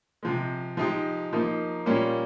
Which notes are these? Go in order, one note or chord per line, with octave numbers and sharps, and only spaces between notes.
C3 F3 G#3
F3 G#3 D#4 G4
F3 A#3 D#4
A#2 G3 A#3 C#4